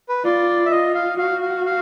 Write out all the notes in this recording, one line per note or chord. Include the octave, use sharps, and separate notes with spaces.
B4
F4 D5
E5
F4 D#5
F5
F#4 F5
F5
F5